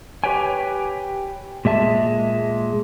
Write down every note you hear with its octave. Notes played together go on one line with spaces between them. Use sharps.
G4 B4 C#5 G5 G#5
A#2 G#3 E5 A5